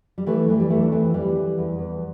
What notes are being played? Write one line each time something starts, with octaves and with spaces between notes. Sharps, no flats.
G3
E3 A3
E3 G3
G3
E2 A3
D4
E3 C4
E3 G3
E3
E2
E2